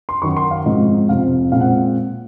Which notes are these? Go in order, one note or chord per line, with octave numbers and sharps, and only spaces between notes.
C6
F#2 D#3 F#3 C#6
C6
F5
G#2 F3 C4 D#5
F2 C3 F3 C4 F5
A#2 G#3 C4 F5
F#5